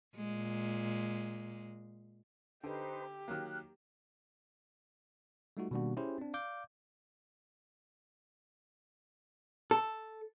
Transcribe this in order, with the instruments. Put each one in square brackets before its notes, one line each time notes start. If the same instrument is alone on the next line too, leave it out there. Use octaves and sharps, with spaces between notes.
[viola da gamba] A#2 G#3
[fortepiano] D3 [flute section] D#4 B4 C5 [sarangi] G4
[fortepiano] D#3 F#3 A#3 [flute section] F6 F#6
[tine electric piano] G3 A3 D#4 F4 F#4
B2 D#3 G3 A#3 D4 F#4
C#4 E4 G4 G#4 C5
C4 D4
D5 F5 D6 G6
[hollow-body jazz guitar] A4